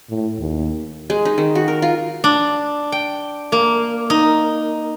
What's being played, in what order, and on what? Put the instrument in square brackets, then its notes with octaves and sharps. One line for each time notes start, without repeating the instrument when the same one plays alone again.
[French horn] A2
D#2
[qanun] G#3
D#4
D#3
F#4
A#4
F4
[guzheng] D4
G5
A#3
D#4